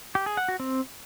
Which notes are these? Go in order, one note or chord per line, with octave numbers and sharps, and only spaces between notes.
G4
G#4
F#5
F#4
C4